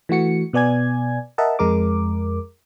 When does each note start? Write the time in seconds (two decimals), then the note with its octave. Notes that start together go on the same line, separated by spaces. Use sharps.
0.09 E3 A3 F#4 C#7
0.53 B2 B3 D5 G#5 G#6
1.38 A#4 D#5 E5 F#5 A5
1.59 F2 G#3 A#4 D6